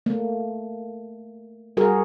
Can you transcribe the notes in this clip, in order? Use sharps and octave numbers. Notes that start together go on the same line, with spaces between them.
A3 A#3
G3 F#4 G#4 A#4